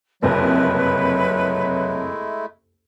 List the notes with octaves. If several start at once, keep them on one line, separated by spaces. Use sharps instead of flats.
F#1 C2 F2 F#3 G#3 A3 E4 B4